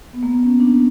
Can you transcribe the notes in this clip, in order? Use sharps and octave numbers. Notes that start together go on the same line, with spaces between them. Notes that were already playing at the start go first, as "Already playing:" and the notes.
B3
A#3
B3
C#4
D4